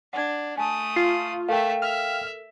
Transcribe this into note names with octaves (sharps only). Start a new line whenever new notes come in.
D4 F#5 G#6
A3 G#5 A5 D#6
F4 C7
A3 A4 A#4 E5 F5 G5
E5 F6